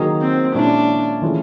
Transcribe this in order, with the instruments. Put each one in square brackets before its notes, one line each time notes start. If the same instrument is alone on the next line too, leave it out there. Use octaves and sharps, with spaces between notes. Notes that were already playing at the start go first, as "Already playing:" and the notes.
Already playing: [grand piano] D#3 F#3 A#3 D#4 G#4
[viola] C4
[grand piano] A#2 F3 G#3 C#4 E4 [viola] D4
[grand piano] E3 A3 C#4 F4 G#4